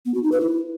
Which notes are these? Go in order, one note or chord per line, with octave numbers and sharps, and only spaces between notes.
B3
F#4
D#4
B4
E4